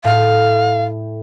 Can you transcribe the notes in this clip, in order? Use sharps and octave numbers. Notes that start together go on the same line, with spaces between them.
A2 F5